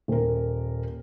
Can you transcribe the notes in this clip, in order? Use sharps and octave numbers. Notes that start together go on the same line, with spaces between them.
D#1 A#4